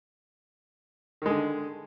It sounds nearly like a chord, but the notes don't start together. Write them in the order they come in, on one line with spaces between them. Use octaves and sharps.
D#3 G#3 D3